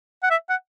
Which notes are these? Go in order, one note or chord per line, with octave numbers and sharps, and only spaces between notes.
F#5
E5
F#5